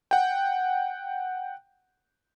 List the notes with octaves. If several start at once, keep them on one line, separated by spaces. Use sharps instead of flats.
F#5 G5